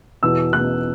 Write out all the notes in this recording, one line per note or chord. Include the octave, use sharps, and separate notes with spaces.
E2 B2 E6
E2 B2 F#6